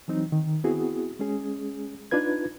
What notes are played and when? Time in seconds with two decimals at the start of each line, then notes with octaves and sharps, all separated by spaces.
0.08 E3 F#3 C4 D#4
0.32 D#3
0.64 B3 C4 E4 F#4 G#4
1.19 G#3 C#4 G#4
2.11 D4 D#4 F4 B4 G#6